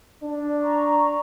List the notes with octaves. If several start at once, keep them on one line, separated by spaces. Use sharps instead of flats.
D4
A#5 C#6